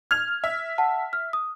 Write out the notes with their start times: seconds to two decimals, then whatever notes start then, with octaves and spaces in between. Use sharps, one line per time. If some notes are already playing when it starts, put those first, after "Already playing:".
0.11 F6 G#6 F7
0.44 E5
0.78 F#5 A5
1.13 F6
1.33 D#6